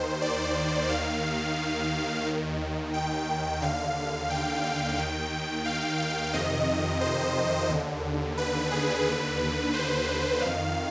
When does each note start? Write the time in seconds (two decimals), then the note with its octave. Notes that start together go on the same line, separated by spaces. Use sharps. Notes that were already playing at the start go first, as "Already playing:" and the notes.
Already playing: D#2 D#3 C5
0.22 D5
0.89 D#2 D#3 F5
2.26 D#2 D#3
2.94 G5
3.62 D#2 D3 F5
4.30 G5
4.63 F5
4.98 D#2 D#3 G5
5.65 F5
5.99 F5
6.33 F2 C3 D#3 D#5
7.01 C5
7.69 D#2 D3
8.37 B4
8.71 G#4
9.06 D#2 D3 B4
9.73 C5
10.41 F2 D#3 F5